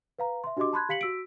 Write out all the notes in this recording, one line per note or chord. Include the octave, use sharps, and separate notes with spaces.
B4 F5 A#5
E5 C6
D4 F#4 G4 D#5 C6 D6
A5 B5 C6 F#6 G#6
G4 F5 B6 C#7 F#7
F#4 E6 B6 D7